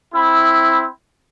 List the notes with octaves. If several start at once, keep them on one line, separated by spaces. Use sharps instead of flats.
C4 E4